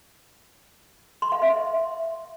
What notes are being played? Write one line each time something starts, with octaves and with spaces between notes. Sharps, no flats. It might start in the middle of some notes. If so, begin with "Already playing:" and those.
C6
F5
E5